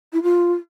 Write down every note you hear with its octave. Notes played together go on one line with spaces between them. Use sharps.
E4
F4